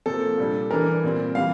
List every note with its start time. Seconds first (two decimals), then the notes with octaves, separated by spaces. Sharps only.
0.06 C3 F3 A#3 A4
0.38 A#2 G3 D4
0.71 E3 G3 D4 A#4
1.03 A#2 G3 C4
1.35 C3 E3 G3 F5